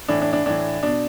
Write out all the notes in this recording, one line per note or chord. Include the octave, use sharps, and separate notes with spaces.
A2 E3 D4
D4
D4
A2 E3 D4
B2 D4